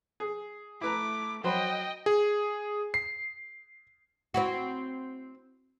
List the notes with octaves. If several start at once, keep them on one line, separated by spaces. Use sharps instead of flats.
G#4
A3 E4 B4 A#5 D6
F#3 C5 D#5 G5 B5
G#4
C7
C4 E4 F#4